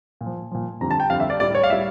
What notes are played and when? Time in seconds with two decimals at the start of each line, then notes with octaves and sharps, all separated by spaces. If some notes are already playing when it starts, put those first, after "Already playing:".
0.21 A#2
0.26 F3
0.51 A#2 F3
0.81 F2 D3 G3 A#5
0.91 A5
1.00 G5
1.10 F2 D3 G3 F5
1.20 E5
1.30 D5
1.40 A2 G3 D5
1.55 C#5
1.63 F5
1.69 A2 G3 E5